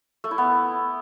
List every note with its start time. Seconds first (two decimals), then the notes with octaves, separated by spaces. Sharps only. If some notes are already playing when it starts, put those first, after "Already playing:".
0.24 A3
0.31 E4
0.38 B3